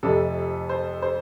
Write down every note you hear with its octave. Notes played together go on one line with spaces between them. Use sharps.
F1 F2 C3 A4
C5
C5